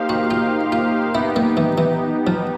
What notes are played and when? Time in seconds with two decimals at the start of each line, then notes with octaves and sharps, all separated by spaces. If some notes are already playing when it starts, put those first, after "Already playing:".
Already playing: A#3 D#4 G4 C5 F5
0.09 F#4
0.31 F4
0.72 F4
1.14 B3 D#4 E4 G4
1.36 A#3
1.57 E3
1.78 E3
2.27 F3